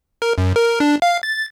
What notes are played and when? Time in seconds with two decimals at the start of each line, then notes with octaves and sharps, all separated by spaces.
0.22 A#4
0.38 F#2
0.56 A#4
0.80 D4
1.02 F5
1.23 A6